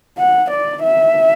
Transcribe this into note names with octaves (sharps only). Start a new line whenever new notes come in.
F#5
D5
E5